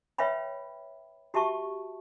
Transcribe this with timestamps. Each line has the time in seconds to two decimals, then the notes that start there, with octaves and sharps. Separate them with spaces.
0.18 B4 C#5 E5 F5 G5 B5
1.34 F#4 G4 E5 A5 C#6